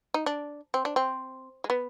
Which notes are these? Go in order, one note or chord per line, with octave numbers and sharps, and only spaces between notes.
D#4
D4
C4
D4
C4
G#3
B3